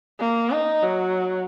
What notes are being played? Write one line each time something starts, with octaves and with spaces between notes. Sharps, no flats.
A#3
D#4
F#3